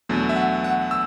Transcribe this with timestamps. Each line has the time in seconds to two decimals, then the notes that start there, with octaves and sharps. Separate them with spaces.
0.09 E2 B2 F#3 A3 D4
0.29 E5
0.36 F#5
0.64 F#5
0.91 E6